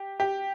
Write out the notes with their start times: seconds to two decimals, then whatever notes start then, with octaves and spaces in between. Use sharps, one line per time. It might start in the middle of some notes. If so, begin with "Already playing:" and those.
Already playing: G4
0.20 G4